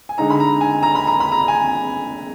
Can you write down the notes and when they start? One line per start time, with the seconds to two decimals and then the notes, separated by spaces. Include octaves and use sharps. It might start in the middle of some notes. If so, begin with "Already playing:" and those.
0.09 G#5
0.18 D3 G#3 D#4 A#5
0.30 B5
0.40 A#5
0.61 G#5
0.83 A#5
0.95 B5
1.07 A#5
1.20 B5
1.32 A#5
1.48 G#5